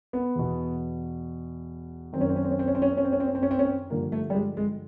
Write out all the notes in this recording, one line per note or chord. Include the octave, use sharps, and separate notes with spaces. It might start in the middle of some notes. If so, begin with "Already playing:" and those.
B3
E2 B2
F#2 D#3 C4 C#4
C4
C#4
C4
C#4
C4
C#4
C4
C#4
C4
C#4
C4
C#4
C4
C#4
C4
C#4
C4
C#4
C4
G2 D3 F3 A#3
A3
G3
G#3
G#3